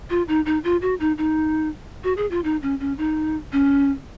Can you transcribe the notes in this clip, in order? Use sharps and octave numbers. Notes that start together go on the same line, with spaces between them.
F4
D#4
D#4
F4
F#4
D#4
D#4
F#4
G#4
F4
D#4
C#4
C#4
D#4
C#4